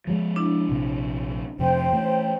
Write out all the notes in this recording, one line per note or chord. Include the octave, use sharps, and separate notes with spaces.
F3 G3 G#3
D4 E4
A#1 C3
F2 C3 C5 G5
E3 A3